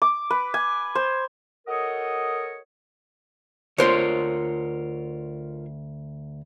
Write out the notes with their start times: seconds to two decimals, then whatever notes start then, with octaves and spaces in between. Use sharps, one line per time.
0.02 D6
0.30 B4
0.54 G#5
0.95 C5
1.67 F#4 A4 A#4 C#5 D#5 D#6
3.78 D2 F4 A#4 C5 C#5 C6